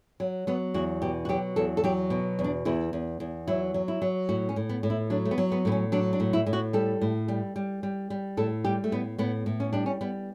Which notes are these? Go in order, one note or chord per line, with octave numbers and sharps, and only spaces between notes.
F#3
F#3 B3
E2 F#4
B2 G4
F#4
F#3 G4
E2 A4
A4
F#3 G4
B2
E2
D4
E2 E4
E2
E2
F#3 E4
F#3
E4
F#3
A2 F#4
C#4
A2
B3
A2
E4
F#3 D4
A3
B3
F#3
B3
A2 B3
C#4
F#3 D4
D4
A2
E4
A2
F#4
G3 A4
A2
G3
G3
G3
G3
A2 A4
G3 G4
A3
A2 B3
A2 B3
A2
C#4
G3 D4
C#4
G3 B3